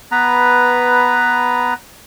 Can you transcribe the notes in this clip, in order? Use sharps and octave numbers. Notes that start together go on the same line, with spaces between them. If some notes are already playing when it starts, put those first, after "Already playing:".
B3 B4 A#5